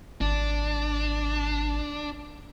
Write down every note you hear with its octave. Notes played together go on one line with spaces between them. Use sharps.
G#1 D4